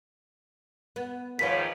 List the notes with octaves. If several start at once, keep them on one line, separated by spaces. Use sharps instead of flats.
B3
D#2 G#2 D#3 F3 B4 C#5 B6